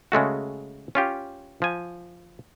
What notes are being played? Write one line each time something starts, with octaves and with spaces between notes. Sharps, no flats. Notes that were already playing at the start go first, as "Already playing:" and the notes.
C#3 G#3 A3 F#4
C#4 F4 G4
F3 G#5